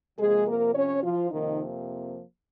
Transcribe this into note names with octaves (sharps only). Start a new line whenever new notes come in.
C3 F3 G#3 A#3 G#4
A#3 A#4
C#4 C#5
F3 F4
F2 C3 D#3 F3 A#3 D#4